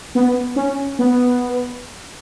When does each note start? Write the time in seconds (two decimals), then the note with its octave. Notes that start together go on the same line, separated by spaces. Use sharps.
0.15 B3
0.56 C#4
0.99 B3